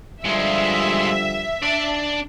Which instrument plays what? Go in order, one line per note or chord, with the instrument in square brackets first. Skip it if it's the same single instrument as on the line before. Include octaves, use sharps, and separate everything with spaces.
[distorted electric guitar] A#2 G#3 [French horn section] D3 F3 G3 [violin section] E5
[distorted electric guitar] D4 D5